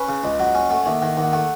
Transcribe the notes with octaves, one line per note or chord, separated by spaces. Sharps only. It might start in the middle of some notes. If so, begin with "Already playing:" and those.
Already playing: C#4 B4
C#3
C#2 D#5
F#3 F#5
C#4
A3 F#5
D#2 E5
D#3 F#5
D#2 F#5
A3 F#5